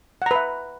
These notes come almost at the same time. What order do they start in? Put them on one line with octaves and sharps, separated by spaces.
F#5 A#5 B4 E5